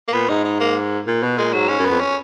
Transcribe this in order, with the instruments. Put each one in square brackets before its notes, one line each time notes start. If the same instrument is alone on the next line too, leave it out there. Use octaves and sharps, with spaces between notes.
[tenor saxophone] A#3
[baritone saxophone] A#2 [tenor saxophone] B3
[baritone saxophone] G#2 [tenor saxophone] D#4
[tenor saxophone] D#4
A#3
[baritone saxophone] A#2
B2
[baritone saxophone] A#2 [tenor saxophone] G#3
[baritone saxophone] G#2 [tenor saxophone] F#3
[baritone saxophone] G#2 [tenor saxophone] C#4
[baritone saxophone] F#2
[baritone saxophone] F2 [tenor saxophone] B3
[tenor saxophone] C#4